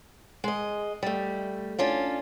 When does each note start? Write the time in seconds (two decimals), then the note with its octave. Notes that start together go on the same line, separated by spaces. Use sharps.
0.44 G#3 D#5
1.03 G3 A3
1.79 C#4 D4 F4